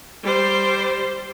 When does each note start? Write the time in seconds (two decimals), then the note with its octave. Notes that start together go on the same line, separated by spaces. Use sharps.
0.23 G3 C5